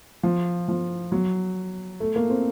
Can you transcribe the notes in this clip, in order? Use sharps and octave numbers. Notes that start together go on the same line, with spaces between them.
F3
F3
F#3
A3
A#3
C4